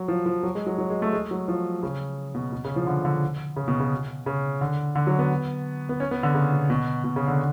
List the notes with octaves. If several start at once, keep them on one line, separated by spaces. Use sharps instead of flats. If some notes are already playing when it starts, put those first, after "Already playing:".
Already playing: F#3
F3
F3
F#3
G#3
F#3
F#3
G#3
A3
G#3
F#3
F3
C#3
B2
B2
C#3
F3
D3
D3
C#3
B2
C#3
C#3
D3
D3
F#3
B3
B3
C#4
B3
D3
C#3
B2
B2
B2
C#3
D3